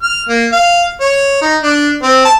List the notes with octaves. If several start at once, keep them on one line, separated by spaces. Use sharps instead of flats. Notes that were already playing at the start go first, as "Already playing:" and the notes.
F6
A#3
F5
C#5
D#4
D4
C4
A5